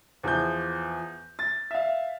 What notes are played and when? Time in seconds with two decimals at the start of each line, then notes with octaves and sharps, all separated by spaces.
0.23 E2 F3 G6
1.39 A6
1.71 E5 F5